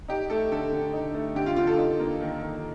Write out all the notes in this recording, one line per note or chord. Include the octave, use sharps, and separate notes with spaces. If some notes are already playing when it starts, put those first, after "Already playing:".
D#4 G4
A3 A4
D3 A4
D3
D#4
A3
D3 G4
F4
D3 F4
A4
D#4
A#3
D#3
D#3